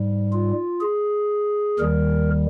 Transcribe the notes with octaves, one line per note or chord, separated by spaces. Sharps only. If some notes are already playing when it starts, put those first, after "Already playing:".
Already playing: G#2 G3
F4
G#4
D#2 D#3 G3 A#4